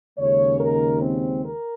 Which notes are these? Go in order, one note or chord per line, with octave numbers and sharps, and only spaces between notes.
D#2 C#3 G#3 C#5
A#4
C4
A#4